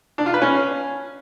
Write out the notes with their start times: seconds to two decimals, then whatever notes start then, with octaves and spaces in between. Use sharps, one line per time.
0.18 D4
0.26 F4
0.34 B4
0.42 C#4